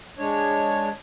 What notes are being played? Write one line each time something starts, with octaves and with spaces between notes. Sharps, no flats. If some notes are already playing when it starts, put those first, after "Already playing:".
G#3 D4 C#5